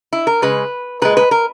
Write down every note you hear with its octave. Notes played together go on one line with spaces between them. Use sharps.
E4
A#4
C#3 G#3 B4
A#2 G#3 B4
B4
A#4